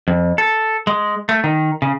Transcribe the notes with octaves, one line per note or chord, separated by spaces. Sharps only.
F2
A4
G#3
A3
D#3
C#3